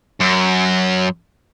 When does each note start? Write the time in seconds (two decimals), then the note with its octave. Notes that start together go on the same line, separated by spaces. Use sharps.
0.20 F#2